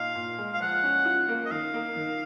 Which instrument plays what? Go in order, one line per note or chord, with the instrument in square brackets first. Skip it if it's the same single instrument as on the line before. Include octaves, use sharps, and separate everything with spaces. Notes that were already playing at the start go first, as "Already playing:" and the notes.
Already playing: [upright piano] A#2 D#4 [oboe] F5
[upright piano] A#2
G#3
[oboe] F5
[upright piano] F3 [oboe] F#5
[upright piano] C#4
F4
A#3
[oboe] D#5
[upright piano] D#3 [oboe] F5
[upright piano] A#3
D#3